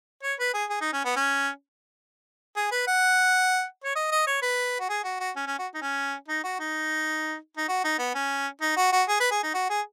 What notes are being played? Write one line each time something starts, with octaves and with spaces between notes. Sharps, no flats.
C#5
B4
G#4
G#4
D#4
C#4
B3
C#4
G#4
B4
F#5
C#5
D#5
D#5
C#5
B4
F#4
G#4
F#4
F#4
C#4
C#4
F#4
D#4
C#4
D#4
F#4
D#4
D#4
F#4
D#4
B3
C#4
D#4
F#4
F#4
G#4
B4
G#4
D#4
F#4
G#4